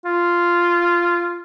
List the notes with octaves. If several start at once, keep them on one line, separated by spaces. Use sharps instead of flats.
F4